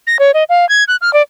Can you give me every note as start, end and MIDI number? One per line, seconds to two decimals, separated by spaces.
0.07 0.17 94
0.19 0.31 73
0.34 0.44 75
0.49 0.68 77
0.69 0.84 92
0.88 0.96 90
1.01 1.12 89
1.13 1.22 74